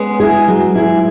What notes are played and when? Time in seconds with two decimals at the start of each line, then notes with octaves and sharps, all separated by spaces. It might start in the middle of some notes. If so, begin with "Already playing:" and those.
Already playing: G#3 B3 C#4
0.20 E4 G#4
0.48 F#3
0.75 E4 G#4